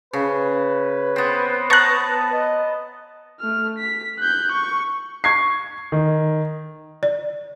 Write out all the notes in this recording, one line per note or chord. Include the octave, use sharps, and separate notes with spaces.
C#3 B4
B3 C4
B3 A5 A#5 C#6 F#6
D#5
A3 F6
B6
F#6 G6
C#6
C#6 G#6 C7
D#3
D5